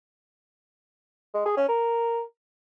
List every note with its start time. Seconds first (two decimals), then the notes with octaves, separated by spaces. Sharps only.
1.34 G#3
1.46 G#4
1.57 C#4
1.69 A#4